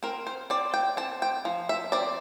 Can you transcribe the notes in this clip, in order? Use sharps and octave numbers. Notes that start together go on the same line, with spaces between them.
C4 A#4
C5
C4 D5
G5
C4 A5
G5
F3
E5
C4 D5